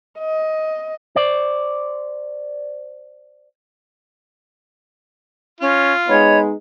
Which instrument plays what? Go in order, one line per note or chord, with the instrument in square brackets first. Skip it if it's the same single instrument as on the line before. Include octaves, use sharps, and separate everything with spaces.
[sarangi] D#5
[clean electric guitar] C5 D5
[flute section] C#4 [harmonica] F4
[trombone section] G#3 B3 D#4 [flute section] C#5 D#5 B5